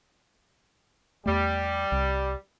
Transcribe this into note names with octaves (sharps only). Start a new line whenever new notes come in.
E2 G3 A3
C2